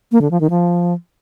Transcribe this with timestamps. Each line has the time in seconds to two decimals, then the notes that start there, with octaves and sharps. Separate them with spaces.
0.12 A#3
0.21 D3
0.31 F3
0.41 D#3
0.50 F3